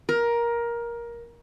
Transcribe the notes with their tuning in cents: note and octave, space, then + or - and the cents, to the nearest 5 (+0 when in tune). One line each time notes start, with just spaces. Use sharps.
A#4 +15